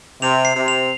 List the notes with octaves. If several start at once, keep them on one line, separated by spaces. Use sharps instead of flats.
C3 F7
C7
C3
F7